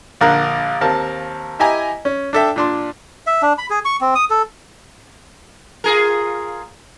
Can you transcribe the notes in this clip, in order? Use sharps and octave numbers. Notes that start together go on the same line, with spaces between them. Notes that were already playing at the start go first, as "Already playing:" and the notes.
A#1 D3 A#4 F5 A#5 F#6
D#2 C4 A#4 F5 A5
E4 G4 D#5 G#5 A#5
C#4
D4 A4 E5 G5
A#2 D4 C6
E5
D4
B5
G#4
C#6
C4
D#6
A4
F4 G#4 A#4